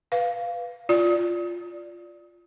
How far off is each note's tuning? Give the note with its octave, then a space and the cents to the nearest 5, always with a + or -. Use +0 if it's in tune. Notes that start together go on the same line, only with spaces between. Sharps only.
B4 +0 F5 +0
F4 +0 D5 +0